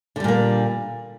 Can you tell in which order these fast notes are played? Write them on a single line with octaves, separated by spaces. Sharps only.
D3 G3 A#2 A#3